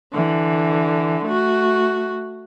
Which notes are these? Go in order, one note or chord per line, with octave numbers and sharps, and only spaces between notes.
D3 E3
A3 F#4